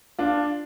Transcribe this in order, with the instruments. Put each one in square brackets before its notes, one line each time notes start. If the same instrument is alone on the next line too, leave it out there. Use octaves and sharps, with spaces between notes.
[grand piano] D4 F4